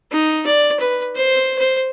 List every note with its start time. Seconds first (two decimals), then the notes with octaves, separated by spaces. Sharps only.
0.12 D#4
0.46 D5
0.80 B4
1.16 C5
1.58 C5